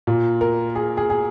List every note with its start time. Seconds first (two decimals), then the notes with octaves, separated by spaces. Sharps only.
0.07 A#2
0.41 A#4
0.75 G#4
0.97 G#4
1.10 G#4